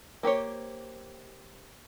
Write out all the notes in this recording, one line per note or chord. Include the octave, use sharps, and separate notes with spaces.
A#3 G4 C5 C#5